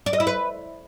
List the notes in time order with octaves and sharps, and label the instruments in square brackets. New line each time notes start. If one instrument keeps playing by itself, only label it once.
[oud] D5
D#5
E4
B4